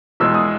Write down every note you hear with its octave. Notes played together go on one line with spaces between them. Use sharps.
E2 B2 G#3 E6
D#6